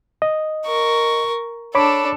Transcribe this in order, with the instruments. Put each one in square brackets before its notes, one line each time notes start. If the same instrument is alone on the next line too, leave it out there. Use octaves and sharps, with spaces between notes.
[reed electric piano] D#5
[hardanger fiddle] A#4 C#6
[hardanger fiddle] D4 A4 [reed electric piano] C#5 B5 D6